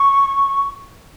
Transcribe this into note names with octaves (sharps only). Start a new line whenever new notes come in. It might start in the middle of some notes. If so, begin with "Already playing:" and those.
Already playing: C#6